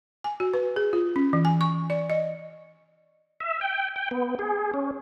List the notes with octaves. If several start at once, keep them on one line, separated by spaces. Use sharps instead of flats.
G#5
F#4
B4
G#4
F4
C#4
E3
G#5
C#6
D5
D#5
E5
G5
G5
B3
G#4
C#4